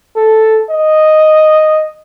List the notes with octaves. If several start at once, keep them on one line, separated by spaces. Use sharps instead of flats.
A4
D#5